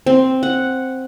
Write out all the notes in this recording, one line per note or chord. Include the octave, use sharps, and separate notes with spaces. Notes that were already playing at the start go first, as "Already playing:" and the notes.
C4
F#5